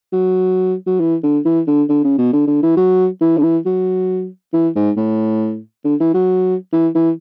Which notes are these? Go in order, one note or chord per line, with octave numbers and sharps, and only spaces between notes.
F#3
F#3
E3
D3
E3
D3
D3
C#3
B2
D3
D3
E3
F#3
E3
D3
E3
F#3
E3
G#2
A2
D3
E3
F#3
E3
E3